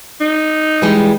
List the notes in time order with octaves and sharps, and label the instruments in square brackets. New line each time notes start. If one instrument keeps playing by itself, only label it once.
[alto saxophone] D#4
[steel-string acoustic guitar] E3 G3 G#3